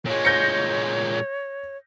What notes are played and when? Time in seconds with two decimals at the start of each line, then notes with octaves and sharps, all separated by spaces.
0.06 A#2 G#3 C#5
0.25 G6 A#6 C#7